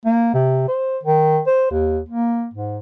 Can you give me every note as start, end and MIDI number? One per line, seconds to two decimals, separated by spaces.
0.06 0.31 58
0.34 0.66 48
0.68 0.98 72
1.03 1.40 51
1.47 1.71 72
1.71 1.99 39
2.09 2.48 58
2.54 2.78 44